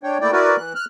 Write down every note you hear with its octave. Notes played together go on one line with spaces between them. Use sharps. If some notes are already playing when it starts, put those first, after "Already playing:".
D4 C#5 G5
A3 A#3 E4 D5 G5
E4 F#4 A#4 B4 D5
E3 F#6
F6 F#6